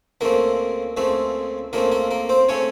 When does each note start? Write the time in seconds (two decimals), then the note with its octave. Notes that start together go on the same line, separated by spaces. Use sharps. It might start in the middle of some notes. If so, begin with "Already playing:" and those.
0.21 C#2 C#3 A3 A#3 C4 A#4
0.97 C#2 C#3 A3 C4
1.73 C#2 C#3 A3 A#3 C4 A#4
1.92 A#3 A#4
2.11 A#3 A#4
2.29 C4 C5
2.49 C#3 A3 C4 C#4 C#5